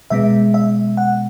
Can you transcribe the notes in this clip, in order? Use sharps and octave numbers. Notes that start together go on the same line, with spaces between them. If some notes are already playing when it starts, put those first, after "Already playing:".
B2 G#3 B3 E5
E5
F#5